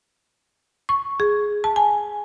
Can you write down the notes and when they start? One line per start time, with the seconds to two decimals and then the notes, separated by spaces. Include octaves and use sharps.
0.89 C#6
1.20 G#4
1.64 A5
1.76 G#5